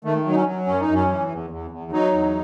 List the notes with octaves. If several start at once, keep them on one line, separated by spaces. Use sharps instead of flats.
D#3 A3
F#3 D#4
C#4
F#3
F#2 C#4
D#4
F#2
C#4
E3
E2
E2
E2
F#3 D#4
E2